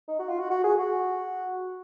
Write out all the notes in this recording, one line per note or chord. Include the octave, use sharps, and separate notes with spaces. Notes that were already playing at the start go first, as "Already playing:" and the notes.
D#4
F#4
F4
F#4
F#4
G#4
F#4